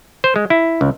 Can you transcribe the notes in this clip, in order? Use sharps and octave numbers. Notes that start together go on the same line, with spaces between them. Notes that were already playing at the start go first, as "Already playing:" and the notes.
C5
G#3
E4
C#2